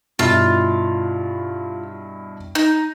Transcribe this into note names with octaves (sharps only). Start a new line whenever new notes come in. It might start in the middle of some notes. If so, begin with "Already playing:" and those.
G2 B2 E4 F4
D#4